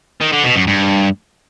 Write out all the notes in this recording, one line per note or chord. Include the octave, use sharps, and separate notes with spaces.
D#3
D3
B2
F#2
G2